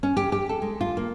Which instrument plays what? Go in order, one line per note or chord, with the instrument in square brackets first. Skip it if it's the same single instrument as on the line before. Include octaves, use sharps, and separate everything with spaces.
[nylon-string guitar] C#4
G4
G4
A4
G#3
F4
A#3